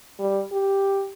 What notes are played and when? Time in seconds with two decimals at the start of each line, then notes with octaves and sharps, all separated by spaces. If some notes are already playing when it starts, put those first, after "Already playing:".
0.19 G3
0.52 G4